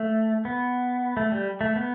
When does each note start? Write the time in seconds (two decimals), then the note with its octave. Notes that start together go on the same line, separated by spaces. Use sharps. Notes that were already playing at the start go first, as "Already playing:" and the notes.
Already playing: A3
0.45 B3
1.17 A3
1.32 G3
1.61 A3
1.76 B3